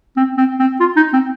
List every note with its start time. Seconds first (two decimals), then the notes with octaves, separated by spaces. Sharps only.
0.17 C4
0.38 C4
0.60 C4
0.80 F4
0.97 D#4
1.13 C4